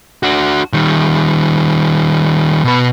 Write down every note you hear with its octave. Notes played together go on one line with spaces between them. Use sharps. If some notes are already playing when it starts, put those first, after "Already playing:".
D4 F#4
D#3 G3
B2 B4